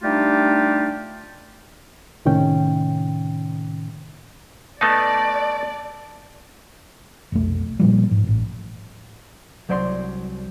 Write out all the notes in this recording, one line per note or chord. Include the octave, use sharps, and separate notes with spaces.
G3 A3 D4 D#4 F4 G4
C#2 A2 C3 D#3 C#4 G5
A3 B3 D#4 D5 A5
F1 B1 A3
A#2 F3 G3
G#2
A1
C2 F#3 C5 D5 F5 C6